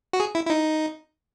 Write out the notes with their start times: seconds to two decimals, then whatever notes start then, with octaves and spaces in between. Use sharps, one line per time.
0.13 F#4
0.20 G#4
0.35 E4
0.46 E4
0.50 D#4